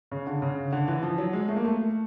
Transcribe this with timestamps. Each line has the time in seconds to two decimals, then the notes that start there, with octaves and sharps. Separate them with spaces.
0.12 C#3
0.27 D3
0.42 C#3
0.72 D3
0.88 E3
1.03 F3
1.18 F#3
1.33 G#3
1.49 A3
1.56 A#3
1.65 A3